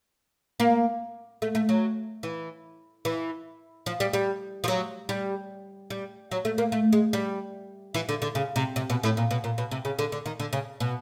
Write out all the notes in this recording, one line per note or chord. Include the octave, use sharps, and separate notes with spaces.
A#3
A3
A3
F#3
E3
E3
F3
G3
G3
F3
F#3
G3
G3
F#3
A3
A#3
A3
G#3
G3
E3
D3
D3
C#3
C3
C3
B2
A2
A#2
B2
A#2
B2
C3
C#3
D3
D3
D#3
D3
C#3
B2